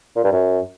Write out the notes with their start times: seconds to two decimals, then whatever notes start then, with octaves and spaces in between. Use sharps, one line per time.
0.16 A#2
0.24 G2
0.32 F#2